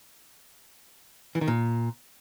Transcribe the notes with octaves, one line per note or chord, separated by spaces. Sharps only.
E3
D#3
A#2